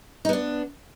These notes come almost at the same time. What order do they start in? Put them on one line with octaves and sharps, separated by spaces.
D#4 B3 D4